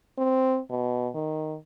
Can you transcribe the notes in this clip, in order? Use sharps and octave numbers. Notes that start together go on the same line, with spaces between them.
C4
B2
D#3